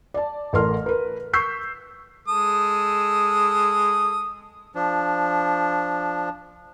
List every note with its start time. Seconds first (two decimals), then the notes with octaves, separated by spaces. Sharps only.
0.14 D5 A5
0.53 A1 A4 A#4 C6 F6
0.86 A#4 B4
1.33 C#6 E6 G6 B6 C7
2.28 G#3 A4 D#6
4.75 F3 D4